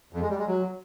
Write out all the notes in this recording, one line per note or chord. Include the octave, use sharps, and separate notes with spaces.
F2
G#3
G3
G#3
F#3